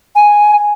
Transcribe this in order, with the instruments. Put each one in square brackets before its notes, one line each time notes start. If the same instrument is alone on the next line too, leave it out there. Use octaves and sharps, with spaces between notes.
[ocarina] G#5